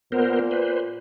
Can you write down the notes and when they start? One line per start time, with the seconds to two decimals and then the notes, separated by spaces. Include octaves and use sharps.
0.12 A#2 B3 A#4 C5
0.51 B4 C5